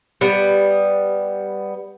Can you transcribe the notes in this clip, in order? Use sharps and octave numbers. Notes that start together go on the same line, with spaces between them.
G3 B3